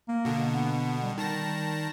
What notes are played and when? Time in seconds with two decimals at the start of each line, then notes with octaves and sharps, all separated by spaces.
0.08 A#3
0.25 B2 D3
0.54 B3
1.04 G3
1.18 D#3 A5 A#6